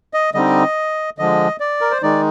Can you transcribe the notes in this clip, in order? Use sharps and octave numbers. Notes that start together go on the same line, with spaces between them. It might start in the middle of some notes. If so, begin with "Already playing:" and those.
D#5
D3 G3 C4 D#4 D#5
D3 F3 G#3 D#5
D5
A#4
C5
D#3 G#3 D#4 D5